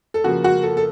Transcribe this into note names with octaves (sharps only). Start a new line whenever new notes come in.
A4
C#3 F3 A#3 F#4
F#4
A4
A4